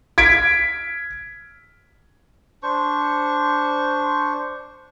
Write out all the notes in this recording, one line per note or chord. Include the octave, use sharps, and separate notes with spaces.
G#6 B6 D7
D4 C5 C#6